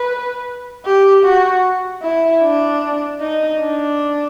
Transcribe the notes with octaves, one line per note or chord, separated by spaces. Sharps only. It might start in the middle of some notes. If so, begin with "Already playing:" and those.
Already playing: B4
G4
F#4
E4
D4
D#4
D4